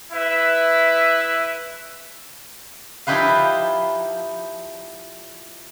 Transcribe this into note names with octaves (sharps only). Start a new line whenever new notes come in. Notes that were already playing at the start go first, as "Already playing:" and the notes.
E4 B4 E5
F3 D#4 E4 G4 B4 F5